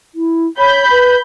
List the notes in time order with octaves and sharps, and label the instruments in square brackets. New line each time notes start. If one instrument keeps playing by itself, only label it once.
[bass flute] E4
[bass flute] C#5 [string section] B5 G6
[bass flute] B4